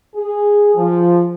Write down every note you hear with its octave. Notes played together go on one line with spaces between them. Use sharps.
G#4
F3